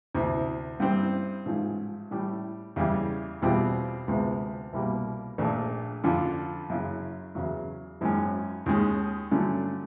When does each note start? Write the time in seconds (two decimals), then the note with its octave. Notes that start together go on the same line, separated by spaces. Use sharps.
0.14 D2 C3 E3
0.80 G2 E3 G3 C4
1.46 A1 G#2 F3
2.11 A2 E3 G3
2.76 E2 C#3 E3 G3
3.42 E2 B2 G3 C4 F4
4.08 D2 C3 F3 G#3 B3
4.73 C2 B2 G3 A#3
5.38 A#1 A#2 F3 A3 D4
6.04 F2 D3 F3
6.70 F#2 C#3 E3
7.35 E2 C#3 F#3
8.01 G#1 F#2 D#3 G#3 C#4
8.66 D#2 D#3 G#3 C#4
9.31 G2 D3 F#3 A3 C#4